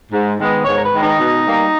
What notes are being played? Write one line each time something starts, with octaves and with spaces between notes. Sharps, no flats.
G#2
D#3 G#3 B3
G#2 C#5
A#4
B4
D#3 G#3 B3
D#4
B2
G3 A#3